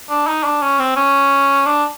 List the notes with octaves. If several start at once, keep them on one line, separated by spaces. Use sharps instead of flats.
D4
D#4
D4
C#4
C4
C#4
D4